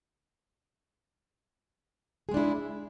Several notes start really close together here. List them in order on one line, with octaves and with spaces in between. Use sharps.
G#4 G#3 D4 E4